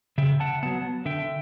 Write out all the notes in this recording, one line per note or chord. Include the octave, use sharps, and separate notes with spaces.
C#3 E5 G5
F#5 A5
F#3 B3 F#5 A5
D3 E5 G5